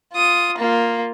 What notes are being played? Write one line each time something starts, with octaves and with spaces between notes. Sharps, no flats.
F4 D#6
A#3 F4